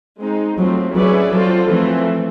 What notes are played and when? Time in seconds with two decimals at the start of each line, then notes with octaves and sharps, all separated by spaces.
0.20 G#3 C4 D#4
0.58 F3 F#3 A3 C4
0.95 F#3 C#4 E4 G#4 B4 D5
1.33 F#3 C4 F4 A4
1.69 E3 F3 A3 C4